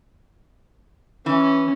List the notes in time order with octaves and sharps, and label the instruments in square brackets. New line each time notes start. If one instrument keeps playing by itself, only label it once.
[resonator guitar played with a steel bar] E3 [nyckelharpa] C#4